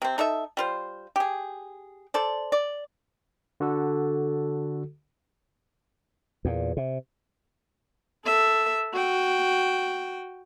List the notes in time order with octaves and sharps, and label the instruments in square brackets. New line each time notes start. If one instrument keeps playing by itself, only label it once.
[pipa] C3 C4
D#4 A4 D#5 E5
G3 F4 C5
G4 G#4
A4 C5 D5
D5
[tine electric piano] D3 F#4 A4
[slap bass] E2 A#2
C3
[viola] A4 E5
F#4 G5